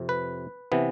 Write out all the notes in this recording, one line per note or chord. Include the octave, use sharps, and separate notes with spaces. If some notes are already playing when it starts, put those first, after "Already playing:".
Already playing: F2 C3
B4
C3 E3 B3